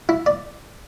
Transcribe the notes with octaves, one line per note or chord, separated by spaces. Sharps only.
E4
D5